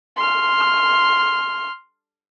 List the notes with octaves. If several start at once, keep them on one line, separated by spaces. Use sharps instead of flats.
C6 F6